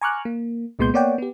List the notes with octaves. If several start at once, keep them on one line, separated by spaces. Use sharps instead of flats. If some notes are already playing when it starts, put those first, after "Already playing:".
G#5 A#5 C#6 D6 F6 F#6
A#3
C2 A#2 G#3 B3 C6 G6
A#3 B3 C#5 D5 F#5 G5
B3 G4